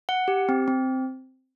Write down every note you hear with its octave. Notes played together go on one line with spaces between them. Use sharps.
F#5
G4
C4
C4